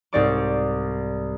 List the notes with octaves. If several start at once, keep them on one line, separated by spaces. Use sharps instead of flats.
C2 G#2 C4 D5 C#6 D6